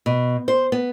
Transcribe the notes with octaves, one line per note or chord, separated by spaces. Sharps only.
B2
C5
B3